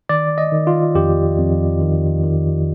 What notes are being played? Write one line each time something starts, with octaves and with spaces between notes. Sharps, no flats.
D#3 D5
D#5
D#3
F4
F2 G4
F2
D#3
D#3